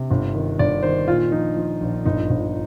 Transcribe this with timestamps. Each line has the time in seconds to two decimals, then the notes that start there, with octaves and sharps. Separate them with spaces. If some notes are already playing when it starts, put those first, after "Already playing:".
Already playing: C3
0.11 G1
0.34 D#3
0.59 G1 D5
0.83 D#3 C5
1.08 A#2 F4
1.31 F3 D#4
1.57 F3
1.81 A#1
2.05 G1 D#4
2.30 G1